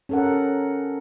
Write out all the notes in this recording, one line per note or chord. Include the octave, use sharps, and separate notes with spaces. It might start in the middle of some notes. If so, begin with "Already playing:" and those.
C#4 G4 A4 A#4 F#5